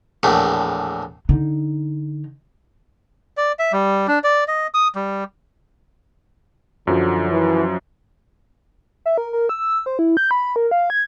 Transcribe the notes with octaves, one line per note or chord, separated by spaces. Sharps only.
A#1 E2 A2
D3 D#4
D5
E5
G3
D4
D5
D#5
D#6
G3
F#2 D3 F3 F#3
E3
E5
A#4
A#4
E6
C5
E4
G6
B5
A#4
F5
G#6